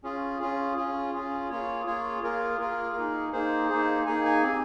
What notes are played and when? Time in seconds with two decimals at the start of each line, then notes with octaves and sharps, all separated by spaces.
0.04 C#4 F4 G#4
0.40 C#4 F4 G#4
0.77 C#4 F4 G#4
1.14 C#4 F4 G#4
1.50 A#3 F4 G#4 C#5
1.86 A#3 F4 G#4 C#5
2.23 A#3 F4 G#4 A#4
2.59 A#3 F4 G#4 A#4
2.96 A#3 D#4 G#4
3.32 A#3 D#4 G#4 C5
3.69 A#3 D#4 G#4
4.06 A#3 D#4 G#4 G#5
4.25 G#5
4.42 C4 G4